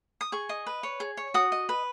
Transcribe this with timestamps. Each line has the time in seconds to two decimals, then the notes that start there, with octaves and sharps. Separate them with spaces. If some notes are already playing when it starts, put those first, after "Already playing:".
0.21 D#6
0.32 G#4 C#6
0.49 D#5
0.67 B4
0.83 C#5
1.00 G#4
1.17 C#5
1.34 F#4 D#6
1.52 D#5
1.69 B4